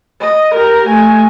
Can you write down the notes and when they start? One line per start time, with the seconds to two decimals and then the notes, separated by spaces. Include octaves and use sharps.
0.21 D#5
0.54 G4 A#4
0.87 A3 G#5